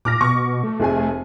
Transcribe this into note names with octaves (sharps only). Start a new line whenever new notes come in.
A#2 D6 F6 A#6
B2 C#6
A3
F1 G#4 G#5